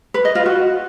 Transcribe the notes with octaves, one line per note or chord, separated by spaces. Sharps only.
B4
D#5
F4
F#4